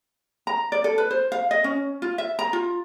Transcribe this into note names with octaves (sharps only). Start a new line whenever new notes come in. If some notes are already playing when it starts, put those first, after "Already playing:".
A#5
D5
A4
B4
C5
F5
D#5
C#4
F4
E5
A#5
F4